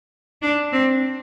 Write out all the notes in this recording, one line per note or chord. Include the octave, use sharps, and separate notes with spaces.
D4
C4